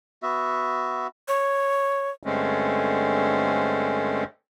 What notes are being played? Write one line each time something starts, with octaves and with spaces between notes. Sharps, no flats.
B3 F#4 E5
C#5
G2 D3 G#3 A3 C4 C#4